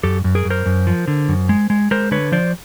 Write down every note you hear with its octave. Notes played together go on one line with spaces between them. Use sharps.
F#2 G4 A4
F#2
G#4 A#4
F#2
A#4 C5
F#2
F3
D3
F#2
G#3
G#3
G#3 A#4 C5
D3 B4 C#5
F3 C5 D5